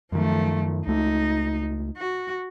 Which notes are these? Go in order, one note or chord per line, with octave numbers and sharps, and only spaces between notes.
F#2 D#3 F3 A3
C#2 A3 D#4
F#4